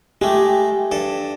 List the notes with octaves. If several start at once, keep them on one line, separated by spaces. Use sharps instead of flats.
G#3 A3 G4
G2 A4